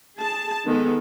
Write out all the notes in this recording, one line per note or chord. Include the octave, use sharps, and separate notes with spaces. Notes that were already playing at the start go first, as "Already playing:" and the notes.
G#4 A5
D#3 G#3 B3 A4